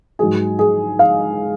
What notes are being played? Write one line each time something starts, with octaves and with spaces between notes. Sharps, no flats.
G#2 F#3 G#4
G#4
F5